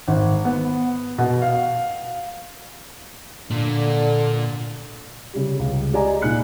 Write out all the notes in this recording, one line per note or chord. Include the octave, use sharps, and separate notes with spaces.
G#1
B3
B2
F5
A#2 D3
C#3 G3
C#2
G4 G#4 D5 D#5 G#5 A#5
A#2 D#4 F#6 C#7